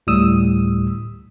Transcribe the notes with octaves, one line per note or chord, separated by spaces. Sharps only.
D2 A2 G3 D#6 E6